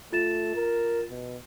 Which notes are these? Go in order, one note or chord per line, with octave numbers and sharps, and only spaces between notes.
A3 F4 A6 E7
A#4
B2